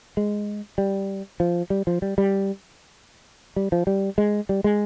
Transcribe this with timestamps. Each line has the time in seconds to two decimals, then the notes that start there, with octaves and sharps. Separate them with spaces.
0.17 G#3
0.78 G3
1.40 F3
1.70 G3
1.87 F3
2.02 G3
2.18 G3
3.56 G3
3.72 F3
3.87 G3
4.18 G#3
4.49 G3
4.64 G#3